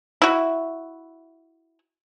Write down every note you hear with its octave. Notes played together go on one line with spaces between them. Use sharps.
E4 F#4